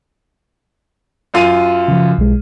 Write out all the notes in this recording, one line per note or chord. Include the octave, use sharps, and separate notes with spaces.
F#2 F4 D#7
C#3 F3
B1 G#3